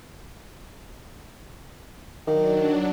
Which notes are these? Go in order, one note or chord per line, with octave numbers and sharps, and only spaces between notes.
D#3 F#3 D4